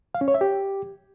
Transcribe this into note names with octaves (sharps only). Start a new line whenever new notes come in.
F5
C#4
C#5
E5
G4